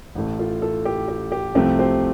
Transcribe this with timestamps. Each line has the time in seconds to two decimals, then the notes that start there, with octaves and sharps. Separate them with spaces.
0.15 A1 A2 A3
0.39 F4 A4
0.62 F4 A4
0.85 G4
1.08 G4
1.32 G4
1.55 C2 C3 F3 A3 C4 G4
1.79 G4 C5